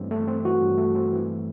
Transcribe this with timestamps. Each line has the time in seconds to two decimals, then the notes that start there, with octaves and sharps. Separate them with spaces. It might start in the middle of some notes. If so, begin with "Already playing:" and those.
Already playing: G2 E3 A3 C4
0.11 A3
0.27 C4
0.45 E3 F#4
0.62 G2
0.78 A3
0.95 C4
1.13 E3